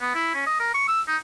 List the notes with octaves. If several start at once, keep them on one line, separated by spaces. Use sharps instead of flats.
B3
E4
C#4
D#5
A#4
C#6
E6
D#4